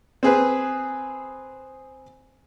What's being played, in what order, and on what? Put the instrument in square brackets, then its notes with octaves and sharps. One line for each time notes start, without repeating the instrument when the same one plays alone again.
[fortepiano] C4 G#4 B4